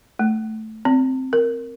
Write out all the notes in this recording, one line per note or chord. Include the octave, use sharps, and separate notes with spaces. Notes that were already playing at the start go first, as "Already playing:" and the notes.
A3
C4
A#4